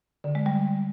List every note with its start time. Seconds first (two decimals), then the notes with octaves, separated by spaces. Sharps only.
0.24 D3
0.35 G#3
0.46 G3